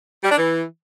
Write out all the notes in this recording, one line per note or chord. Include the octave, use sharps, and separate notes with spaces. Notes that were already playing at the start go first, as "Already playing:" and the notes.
G3
D4
E3